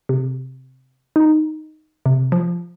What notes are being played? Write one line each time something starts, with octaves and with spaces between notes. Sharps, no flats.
C3
D#4
C3
F3